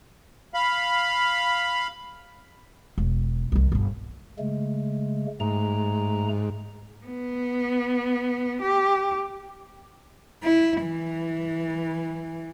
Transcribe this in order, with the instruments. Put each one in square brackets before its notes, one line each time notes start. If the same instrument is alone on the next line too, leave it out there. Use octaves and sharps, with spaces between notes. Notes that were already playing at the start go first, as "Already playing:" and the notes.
[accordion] F5 B5
[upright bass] E1
C2 D#3
G1 D3
[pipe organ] C#3 G#3 A3
[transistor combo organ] G#2 [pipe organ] A3 A#5
[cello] B3
G4
E4
E3